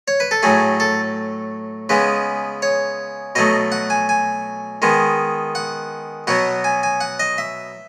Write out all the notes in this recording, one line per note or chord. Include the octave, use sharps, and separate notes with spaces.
C#5
B4
A4
A2 F#3 A3 G#4
A4
C#3 G#3 B3 B4
C#5
B2 F#3 A3 D#5
F#5
G#5
G#5
D#3 G#3 B3
F#5
B2 F#3 B3 F#5
G#5
G#5
F#5
D#5
E5